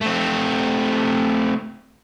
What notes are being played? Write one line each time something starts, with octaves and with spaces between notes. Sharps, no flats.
A3 C4